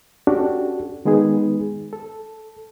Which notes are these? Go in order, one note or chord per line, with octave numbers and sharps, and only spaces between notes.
C#4 D4 F#4 G4 A4
D#3 G#3 B3 D#4 G#4 B4
A4